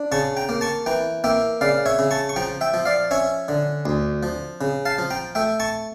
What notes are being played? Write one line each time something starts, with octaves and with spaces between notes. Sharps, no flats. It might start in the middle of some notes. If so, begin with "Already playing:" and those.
Already playing: D4
C#3 A5 C#6
G5 A#5
A#3
A5 C#6
E3 G5 A#5
A#3 E5 G5
C#3 D5 F5
C#5 E5
C#3
A5 C#6
C#6
F3 G5 A#5
E5 G5
F3
D5 F5
C#4 C#5 E5
D3
D2
F3
C#3
F5 A5
F3
G5 A#5
A3 E5 G5
A5 C#6